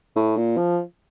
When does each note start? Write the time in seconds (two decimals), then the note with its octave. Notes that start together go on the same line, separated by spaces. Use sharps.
0.16 A2
0.37 A#2
0.57 F3